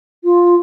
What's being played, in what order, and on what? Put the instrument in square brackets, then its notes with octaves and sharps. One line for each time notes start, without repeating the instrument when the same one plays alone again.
[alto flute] F4